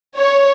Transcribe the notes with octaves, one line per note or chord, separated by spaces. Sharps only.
C#5